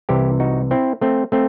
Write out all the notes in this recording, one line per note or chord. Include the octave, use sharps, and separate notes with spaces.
C2 C3 E3 E4 G4
D#4 F#4
C4 E4
A3 C4
A3 C4